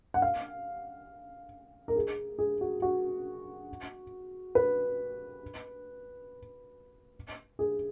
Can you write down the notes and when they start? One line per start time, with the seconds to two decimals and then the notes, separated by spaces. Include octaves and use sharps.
0.14 F#5
0.22 F5
1.88 A#4
1.96 G#4
2.39 G#4
2.61 F#4
2.82 F#4
4.55 B4
7.59 G#4